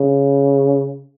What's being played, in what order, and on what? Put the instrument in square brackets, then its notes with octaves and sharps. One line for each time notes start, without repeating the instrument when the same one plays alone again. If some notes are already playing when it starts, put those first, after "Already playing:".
Already playing: [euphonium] C#3